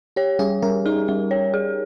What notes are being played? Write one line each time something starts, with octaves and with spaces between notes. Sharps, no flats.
G4 C#5
G3 G#4
G3 A#4
D#4 G#4
G3 D#4
C#5
G#4